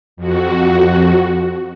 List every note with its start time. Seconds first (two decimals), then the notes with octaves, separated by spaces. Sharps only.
0.17 F2 F#4